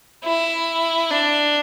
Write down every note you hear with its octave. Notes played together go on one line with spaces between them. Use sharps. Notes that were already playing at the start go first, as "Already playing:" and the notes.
E4
D4